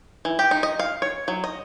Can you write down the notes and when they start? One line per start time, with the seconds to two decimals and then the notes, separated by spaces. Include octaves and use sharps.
0.25 E3
0.39 G4
0.51 D#4
0.63 D#5
0.79 F5
1.02 C#5
1.28 F#3
1.44 D#5